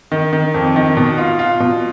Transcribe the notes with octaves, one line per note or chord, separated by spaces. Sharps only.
D#3
D#3
F2
D#3
B2
F4
F4
B2